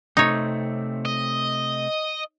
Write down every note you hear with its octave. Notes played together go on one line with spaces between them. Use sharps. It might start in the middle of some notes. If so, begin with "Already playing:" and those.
C3 A3 C4 D#4 C#5
D#5